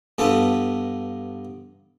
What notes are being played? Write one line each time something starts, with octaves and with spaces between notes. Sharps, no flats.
G2 B3 F4 A4